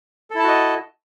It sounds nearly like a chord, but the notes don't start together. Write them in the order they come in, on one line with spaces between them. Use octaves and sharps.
A4 E4 A5 F#4 D#5